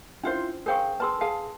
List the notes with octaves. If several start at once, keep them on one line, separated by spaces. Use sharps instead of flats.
C#4 D4 E4 F4 C5
G#4 A#4 C5 F5 G5 C#6
G#4 B4 A5 C6 E6
G#4 F5 A5